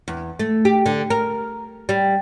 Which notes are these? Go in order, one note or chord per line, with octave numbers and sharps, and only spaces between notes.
E2
A3
G4
D3
A#4
G3